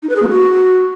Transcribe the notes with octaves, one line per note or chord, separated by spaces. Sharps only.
D#4
B4
G#4
A#3
F#4